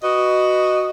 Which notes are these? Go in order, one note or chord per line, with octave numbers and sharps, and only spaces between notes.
F#4 B4 D#5